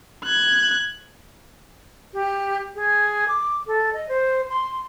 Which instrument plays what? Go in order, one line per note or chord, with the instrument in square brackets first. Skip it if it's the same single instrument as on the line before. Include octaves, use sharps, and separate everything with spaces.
[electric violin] F#6 G#6
[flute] G4
G#4
D6
A4
D#5
C5
C6